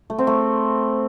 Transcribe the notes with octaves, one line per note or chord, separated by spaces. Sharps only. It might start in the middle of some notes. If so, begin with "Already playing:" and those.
A3
C4
A3